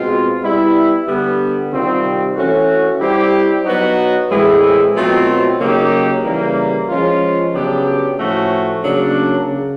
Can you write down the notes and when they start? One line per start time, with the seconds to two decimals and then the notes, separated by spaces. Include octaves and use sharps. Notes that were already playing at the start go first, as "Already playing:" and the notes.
Already playing: B2 G#3 C4 F4
0.41 G3 B3 E4
1.06 D3 G3 B3
1.70 C3 D#3 G3 C4 F4
2.35 E3 A3 C#4 F#4
2.99 G3 C4 E4 G4
3.64 F#3 B3 D#4 F#4
4.29 A2 E3 G#3 C4 E4
4.94 B2 F#3 A3 C4 F4
5.59 C#3 F#3 A#3 D#4 G4
6.23 C#3 E3 G3 A#3
6.89 F3 G#3 C#4 F4
7.53 C#3 F#3 B3 D4 G4
8.17 A2 F3 A3 C#4 F#4
8.82 C#3 F#3 A#3 D4
9.46 C#3